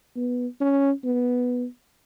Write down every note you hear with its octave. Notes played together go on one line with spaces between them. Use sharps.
B3
C#4
B3